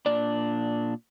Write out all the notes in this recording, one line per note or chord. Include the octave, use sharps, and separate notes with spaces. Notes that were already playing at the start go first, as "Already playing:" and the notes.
A#2 D4 D5